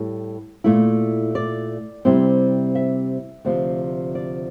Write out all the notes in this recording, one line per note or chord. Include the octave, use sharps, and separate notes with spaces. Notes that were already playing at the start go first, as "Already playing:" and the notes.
Already playing: A2 G3
A#2 A3 E4
D5
C3 G3 C4 E4
E5
D2 C3 F3 C5
D5